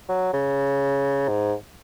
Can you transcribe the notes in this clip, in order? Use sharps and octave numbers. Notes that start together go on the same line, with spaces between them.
F#3
C#3
G#2